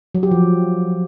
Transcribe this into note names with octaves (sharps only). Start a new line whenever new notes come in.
F#3
G4
F3